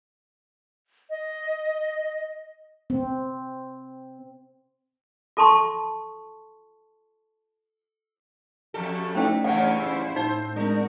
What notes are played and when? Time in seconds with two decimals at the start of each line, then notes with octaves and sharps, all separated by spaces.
1.10 D#5
2.90 C4
5.37 F4 A4 A5 C6 C#6
8.74 F2 G4 A4
9.15 A3 C#4 D#4 E4 C5 D5 G5
9.44 G2 C#3 E3 C#5 F#5
9.80 C#4 E4 C5 E6
10.16 A2 D#4 C5
10.56 G#3 C4 D4 F#4 A#4